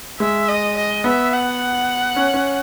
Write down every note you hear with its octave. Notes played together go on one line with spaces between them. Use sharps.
G#3 E5
D#5
D#5
B3 E5
F#5
C#4
C#4